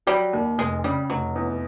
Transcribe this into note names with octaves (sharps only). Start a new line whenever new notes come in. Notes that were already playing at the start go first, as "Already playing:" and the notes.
F#3 G3
D#2
F1 G#3
C#3 G3
F1 F#3
E2